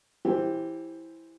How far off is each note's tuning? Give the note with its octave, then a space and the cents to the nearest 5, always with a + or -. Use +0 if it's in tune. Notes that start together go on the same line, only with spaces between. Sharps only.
E3 +0 G4 +0 C5 +10